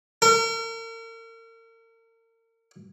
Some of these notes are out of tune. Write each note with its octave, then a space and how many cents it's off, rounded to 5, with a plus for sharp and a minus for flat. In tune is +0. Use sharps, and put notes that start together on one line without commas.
A#4 -40